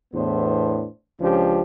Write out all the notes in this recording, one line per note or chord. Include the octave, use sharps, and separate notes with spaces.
E2 A2 B3 D4 C5
C#2 F3 C#4 D4 G4